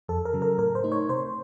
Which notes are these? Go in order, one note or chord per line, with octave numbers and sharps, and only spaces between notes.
F2 A4
A#4
C#3 F#3
A#4
A2 A#4
C5
A3 D#4
C#5
C3 C5